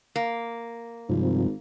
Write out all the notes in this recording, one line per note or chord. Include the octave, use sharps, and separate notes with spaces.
A#3
G#1 G2 C3 F3